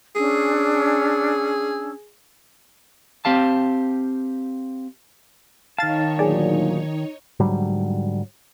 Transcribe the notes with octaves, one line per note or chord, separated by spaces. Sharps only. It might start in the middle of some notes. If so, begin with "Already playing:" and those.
C#4 D4 G#4 E6
C4 G4 F5 A5
D#3 D#4 C#5 F5 A5 A6
D2 A#2 F#3 G#4 D5
G#2 D3 F#3 G3